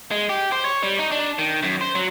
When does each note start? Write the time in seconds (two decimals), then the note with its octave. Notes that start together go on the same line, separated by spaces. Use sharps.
0.11 G#3
0.29 G4
0.52 C5
0.65 C#5
0.83 G3
0.98 D#4
1.12 D4
1.39 D#3
1.63 F#2
1.81 C5
1.95 F#3